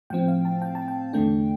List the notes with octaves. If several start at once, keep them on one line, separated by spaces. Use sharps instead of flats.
A2 F3 C4 G5
F5
A5
G5
A5
G5
E2 D3 A3 D4 G5